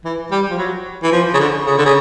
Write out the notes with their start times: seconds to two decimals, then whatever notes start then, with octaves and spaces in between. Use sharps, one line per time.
0.05 E3
0.31 G3
0.50 F3
0.58 F#3
1.03 E3
1.12 F3
1.34 C#3
1.40 D3
1.66 C#3
1.78 D3
1.85 C#3